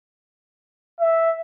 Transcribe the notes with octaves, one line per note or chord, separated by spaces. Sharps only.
E5